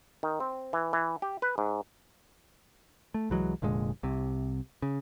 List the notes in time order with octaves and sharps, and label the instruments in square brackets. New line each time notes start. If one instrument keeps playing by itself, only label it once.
[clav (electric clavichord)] D#3
C4
E3
E3
G4
B4
G#2
[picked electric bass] A3
C2 E3 F#3 G#3
F1 A#2 D3 G#3
C2 C3
C#3